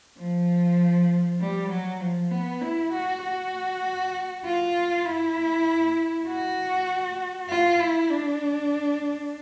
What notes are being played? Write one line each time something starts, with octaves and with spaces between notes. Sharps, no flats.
F3
G3
F#3
F3
B3
E4
F#4
F#4
F4
E4
F#4
F4
E4
D4